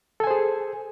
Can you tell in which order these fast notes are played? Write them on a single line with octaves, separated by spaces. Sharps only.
A4 G#5 C5 G#4